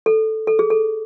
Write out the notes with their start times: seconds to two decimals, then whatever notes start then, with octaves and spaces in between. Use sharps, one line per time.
0.06 A4
0.47 A4
0.59 G#4
0.70 A4